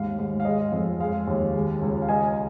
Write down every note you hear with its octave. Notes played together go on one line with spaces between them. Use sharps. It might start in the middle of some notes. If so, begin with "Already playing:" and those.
Already playing: D#2 G#2 F5
G#2
F5
G#3 D#5
F2
G#3 F5
D#2
G#3
C#2
F5
G#3 D#5 G#5